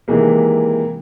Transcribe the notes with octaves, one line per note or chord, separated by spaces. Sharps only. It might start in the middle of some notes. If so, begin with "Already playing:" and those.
C3 D#3 E3 G#3 A#3